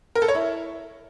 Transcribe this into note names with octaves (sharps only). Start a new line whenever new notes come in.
A#4
A4
C#5
E4